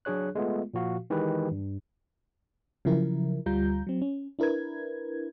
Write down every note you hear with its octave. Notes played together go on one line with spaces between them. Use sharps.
F#3 D4 G#4 C#5 F#6
G#3 A3 B3 F4
A#2 F3 F#4 F5
D#3 E3 G#3 G4 B4
G2
C#3 F3 F#3 E4 A#4
D2 G3 F4 A#5 G6
F#3 C4
C#4
D4 E4 A#4 B4 G#6